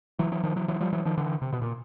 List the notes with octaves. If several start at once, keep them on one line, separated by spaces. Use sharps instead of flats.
E3 F#3
E3 F#3
D#3 F3
E3 F#3
E3 F#3
F3 G3
E3 F#3
D#3 F3
D3 E3
C3
B2
A#2